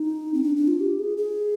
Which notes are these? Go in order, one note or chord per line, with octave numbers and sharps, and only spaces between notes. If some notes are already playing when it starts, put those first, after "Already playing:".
Already playing: D#4
C4
D4
D4
F4
G4
G#4
G#4